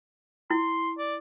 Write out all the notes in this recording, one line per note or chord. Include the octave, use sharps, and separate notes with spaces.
E4 C6
D5